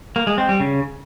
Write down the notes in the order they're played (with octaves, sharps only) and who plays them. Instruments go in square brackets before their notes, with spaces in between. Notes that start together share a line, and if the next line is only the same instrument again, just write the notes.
[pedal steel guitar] A#3
G#3
C4
G3
C#3